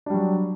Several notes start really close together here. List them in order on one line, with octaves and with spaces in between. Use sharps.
D4 G3 F#3